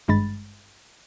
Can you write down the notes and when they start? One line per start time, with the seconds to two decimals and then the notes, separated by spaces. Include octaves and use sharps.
0.08 G#1 G2 G#3 B5 A6